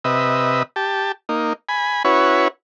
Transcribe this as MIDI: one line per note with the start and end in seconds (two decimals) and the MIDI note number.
0.05 0.63 48
0.05 0.63 71
0.05 0.63 75
0.05 0.63 76
0.76 1.12 67
0.76 1.12 81
1.29 1.53 58
1.29 1.53 63
1.69 2.03 80
1.69 2.03 83
2.05 2.48 61
2.05 2.48 64
2.05 2.48 66
2.05 2.48 71
2.05 2.48 73